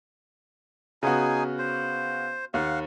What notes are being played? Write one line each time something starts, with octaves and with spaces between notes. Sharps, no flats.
C#3 B3 D#4 F#4 G#4 G#5
C5
D#2 F5 F#5